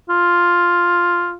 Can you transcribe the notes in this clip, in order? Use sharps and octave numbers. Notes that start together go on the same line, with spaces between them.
F4